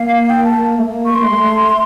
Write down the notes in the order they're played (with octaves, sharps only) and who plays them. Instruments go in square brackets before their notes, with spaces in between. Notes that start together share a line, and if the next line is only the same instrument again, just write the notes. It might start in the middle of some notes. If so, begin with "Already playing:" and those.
Already playing: [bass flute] A#3 [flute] F5
[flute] G5
A5
[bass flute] A#3
A3
A#3
[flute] C#6
[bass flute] A#3 [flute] C6
[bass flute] A3
G#3
A3